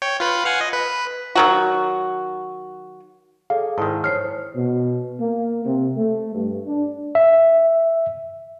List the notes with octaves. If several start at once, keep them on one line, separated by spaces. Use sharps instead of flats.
C#5 G5
F4 B4 B5
F5 F#5 G#5
D#5
B4
D#3 F#3 F#4
G#4 A4 D5 F5
G#2 D#3 E4 A5
C5 C#5 F6 C7
B2
A#3
C3
A3
G2
D4
E5